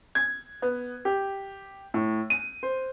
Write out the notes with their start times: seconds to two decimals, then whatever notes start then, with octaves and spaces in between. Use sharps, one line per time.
0.15 G#6
0.62 B3
1.05 G4
1.94 A2
2.30 D#7
2.63 C5